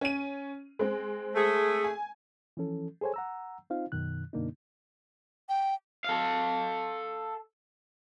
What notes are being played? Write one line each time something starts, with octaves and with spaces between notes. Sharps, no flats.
C#4 D#7
G#3 C4
A3 G#4
G#5
E3 F3 C#4 A4
G#4 A4 C5 C#5 G#5
F#5 A#5 E6
C4 D#4 F4 C5 F5
F#2 B2 D#3 F#6
F#2 B2 D3 A#3 D4 D#4
G5
A4 F5